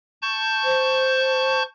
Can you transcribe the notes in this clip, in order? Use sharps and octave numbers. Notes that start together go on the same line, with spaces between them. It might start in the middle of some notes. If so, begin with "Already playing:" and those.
A5 C#6 G6
C5